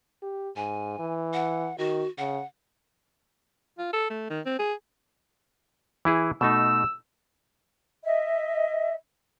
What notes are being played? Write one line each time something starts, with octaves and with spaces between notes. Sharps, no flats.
G4
G#2 G#5
E3
F#5
D#3 F#4
C#3 F#5
F4
A4
A3
D#3
C4
G#4
E3 E4 G#4
B2 A3 D#4 E6
D#5 E5